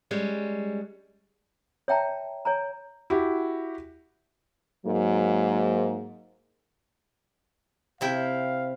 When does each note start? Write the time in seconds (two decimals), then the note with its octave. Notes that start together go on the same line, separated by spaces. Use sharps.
0.11 G3 G#3 C#4
1.88 C#5 E5 G5 A5 A#5
2.45 C#5 G#5 A#5
3.10 E4 F#4 G4
4.86 G#2 F#3 A#3
8.01 C3 E4 F5 G5